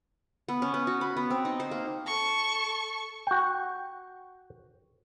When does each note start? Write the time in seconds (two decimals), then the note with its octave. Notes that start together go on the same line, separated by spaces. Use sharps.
0.48 B3
0.62 C#4
0.74 B3
0.87 F#4
1.01 B5
1.17 B3
1.30 C4
1.45 D#4
1.60 C5
1.71 A#3
2.06 A4 C#6
3.27 F#4 G5